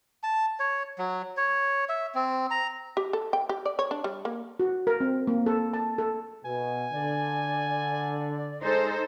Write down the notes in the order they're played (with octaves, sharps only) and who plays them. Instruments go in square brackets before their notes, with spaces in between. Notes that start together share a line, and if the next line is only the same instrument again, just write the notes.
[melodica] A5
C#5
F#3
C#5
E5
C4
A#5
[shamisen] G4
A4
G5
G4
D5
C#5
D4
G3
A#3
[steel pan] F#4
A#4
C4
A#3
A4
A5
A4
[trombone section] B2 [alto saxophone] G#5
[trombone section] D3 [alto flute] D5
[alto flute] G#3 [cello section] D#4 A4 C5